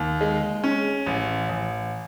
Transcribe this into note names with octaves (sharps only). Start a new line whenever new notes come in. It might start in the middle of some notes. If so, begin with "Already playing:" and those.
Already playing: D#2
G#3
C#4
A1
A1